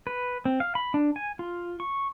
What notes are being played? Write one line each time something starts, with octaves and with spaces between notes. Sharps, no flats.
B4
C4
F5
B5
D4
G#5
F4
C#6